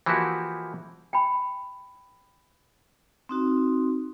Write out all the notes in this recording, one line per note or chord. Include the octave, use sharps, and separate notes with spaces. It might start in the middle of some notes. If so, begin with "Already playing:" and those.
E3 F3 A#3 E4 F#4 G4
G5 G#5 B5
C4 D#4 F#4